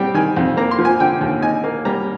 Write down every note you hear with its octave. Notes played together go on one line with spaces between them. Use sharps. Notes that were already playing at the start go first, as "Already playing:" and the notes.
Already playing: G3 C4 G5
D#3 G#5
F2
A#3 A#5
C6
F3
G#5
D3 G5
D#2
D#4 G#5
A#3
G3 A#5